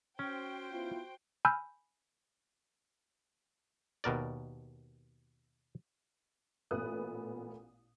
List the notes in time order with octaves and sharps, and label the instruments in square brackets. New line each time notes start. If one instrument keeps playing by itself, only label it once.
[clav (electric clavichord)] C#4 [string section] F#4 C5 G5
[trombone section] B3 E4 F4
[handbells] G#5 B5 E6 F6 G6
[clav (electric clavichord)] D#2 B2 A#4 D5
[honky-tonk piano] A1 A#2 A3 B3 D#6 F#6